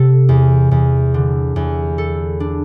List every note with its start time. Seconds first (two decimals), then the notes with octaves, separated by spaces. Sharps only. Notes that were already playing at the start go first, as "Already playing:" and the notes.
Already playing: C3 A4
0.29 E2
0.71 E2
1.14 D3
1.56 E2
1.98 A4
2.40 D4